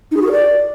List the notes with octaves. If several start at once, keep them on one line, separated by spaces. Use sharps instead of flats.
D#4
G#4
F#4
A#4
D5